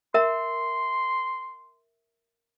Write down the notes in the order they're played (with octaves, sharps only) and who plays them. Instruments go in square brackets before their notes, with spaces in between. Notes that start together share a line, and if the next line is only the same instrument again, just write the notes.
[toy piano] A#4 E5 A#5 [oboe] C6